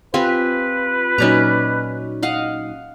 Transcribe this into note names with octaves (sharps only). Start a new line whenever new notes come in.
C4 F4 G4 B4 G#5
A#2 F#3 C#4 D#4 D5 A#5
D#5 F5 F#5